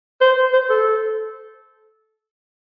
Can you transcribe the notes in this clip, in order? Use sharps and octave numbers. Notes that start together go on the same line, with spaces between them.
C5
C5
A4